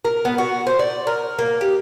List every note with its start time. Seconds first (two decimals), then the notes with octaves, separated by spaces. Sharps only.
0.05 A#4
0.25 B3
0.38 F#4
0.67 C5
0.79 D5
1.07 A#4
1.39 A#3
1.61 G4